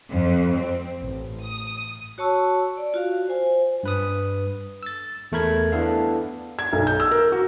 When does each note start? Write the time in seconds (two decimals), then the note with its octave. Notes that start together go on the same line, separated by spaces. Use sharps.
0.11 F2
0.56 C4
0.99 A1
1.44 D#6
2.18 F#4 C#5 A5 C#6 E6
2.77 D5
2.94 F4 F#4 F5
3.28 C5 G#5
3.83 G2 B4 D#6
4.83 E6 A6
5.32 E2 A3 A#4 B5 G#6
5.72 B3 D4 E4 A4 F5
6.59 G#6
6.73 B1
6.87 G6
7.00 E6
7.11 A#4
7.32 F#4